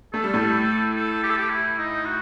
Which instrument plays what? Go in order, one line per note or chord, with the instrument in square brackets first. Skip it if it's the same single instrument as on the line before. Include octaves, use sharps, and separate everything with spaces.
[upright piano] A3 [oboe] A4
[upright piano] G3
A2 A3
[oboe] A4
G4
A4
G4
E4
D#4
F#4